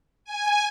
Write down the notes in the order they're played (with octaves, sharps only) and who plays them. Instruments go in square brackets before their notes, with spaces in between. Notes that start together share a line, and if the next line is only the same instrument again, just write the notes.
[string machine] G#5